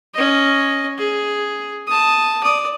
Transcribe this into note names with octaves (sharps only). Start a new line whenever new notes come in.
C#4 D#5
G#4
A5 D#6
D5 D#6